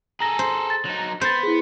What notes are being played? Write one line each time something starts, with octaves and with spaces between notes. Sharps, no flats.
G#4 A4 A#5 A#6
C5
A6
F#3 D#4
B3 C5 G6 A6
E4 G#4